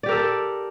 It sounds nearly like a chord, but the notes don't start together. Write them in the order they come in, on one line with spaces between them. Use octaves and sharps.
D5 G4 A#4 A4